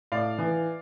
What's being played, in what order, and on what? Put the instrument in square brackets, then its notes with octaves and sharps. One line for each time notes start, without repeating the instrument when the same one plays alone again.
[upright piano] A2 D5 F5
E3